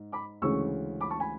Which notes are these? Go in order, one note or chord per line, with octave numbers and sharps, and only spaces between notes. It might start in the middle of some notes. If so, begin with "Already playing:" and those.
Already playing: G#2
B5 D6
D2 C#3 E3 G#3 C#4 C#6 E6
B5 D6
A5 C#6
G#5 B5